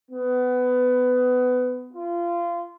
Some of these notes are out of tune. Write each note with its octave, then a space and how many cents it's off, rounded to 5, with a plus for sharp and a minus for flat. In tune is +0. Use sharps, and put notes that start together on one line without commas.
B3 +20
F4 -25